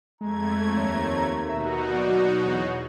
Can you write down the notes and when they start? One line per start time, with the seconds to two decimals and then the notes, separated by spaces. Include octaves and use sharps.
0.21 F2 G#3 A3 A#5 G#6
0.77 D#2 C#5
1.49 B2 D#4 F#4 E5 A#5
1.92 F#3 D5
2.45 E2 C#5